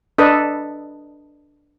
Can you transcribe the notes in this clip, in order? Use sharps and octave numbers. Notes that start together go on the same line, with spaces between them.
D4 A4 B4 D#5